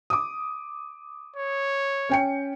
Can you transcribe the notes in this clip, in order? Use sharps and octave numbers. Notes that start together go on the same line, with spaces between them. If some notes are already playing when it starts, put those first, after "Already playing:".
D6 D#6
C#5
C#4 G5 C#7